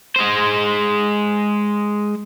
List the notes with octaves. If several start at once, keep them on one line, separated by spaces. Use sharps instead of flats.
G#3 C5